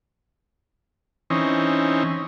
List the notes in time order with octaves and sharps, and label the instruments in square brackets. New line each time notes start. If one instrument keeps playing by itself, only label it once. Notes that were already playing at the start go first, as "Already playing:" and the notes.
[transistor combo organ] E3 C4 C#4 D#4